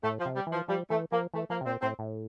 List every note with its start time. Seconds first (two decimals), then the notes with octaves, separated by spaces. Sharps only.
0.03 A2 A3
0.20 F3
0.25 C3
0.36 G3
0.47 E3
0.52 F3
0.68 F3 G3
0.90 E3 A3
1.11 F3 A#3
1.34 E3 A3
1.50 F3 A#3
1.61 C3
1.66 A#2 C4
1.82 A2 C4
1.99 A2